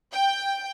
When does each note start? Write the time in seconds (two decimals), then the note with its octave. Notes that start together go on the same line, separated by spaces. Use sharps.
0.12 G5